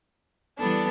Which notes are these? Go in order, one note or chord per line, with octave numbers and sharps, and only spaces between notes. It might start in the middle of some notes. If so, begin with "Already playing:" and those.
E3 G3 B3 D4 A4